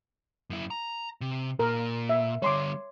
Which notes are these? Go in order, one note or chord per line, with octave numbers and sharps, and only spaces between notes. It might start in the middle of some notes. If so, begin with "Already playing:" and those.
F#2 E4
A#5
C3
A#2 A#4
E5
D3 G3 C#5 C6 D6